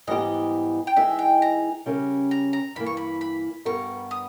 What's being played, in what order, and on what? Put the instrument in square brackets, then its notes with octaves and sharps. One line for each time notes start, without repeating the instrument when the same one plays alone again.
[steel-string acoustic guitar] G#2 E3 G3 B3 G4 [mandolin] D#5
[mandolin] G5
[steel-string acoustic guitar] E3 G#3 D#4 G#4 [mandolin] E5
[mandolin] G5
A#5
[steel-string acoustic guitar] C#3 G3 C#4 G4 A#4
[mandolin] A#5
A#5
[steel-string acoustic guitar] G2 E3 A#3 [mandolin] B5
[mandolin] C#6
B5
B5
[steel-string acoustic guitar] G2 G3 B3 G4 A#4 [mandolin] C#6
[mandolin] D#6